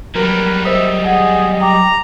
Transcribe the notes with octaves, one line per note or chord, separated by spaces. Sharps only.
F#3 G3 A#4 B4
A#4 C5 D#5 E5 D#6
G#4 F#5 G#5
G5 A#5 D6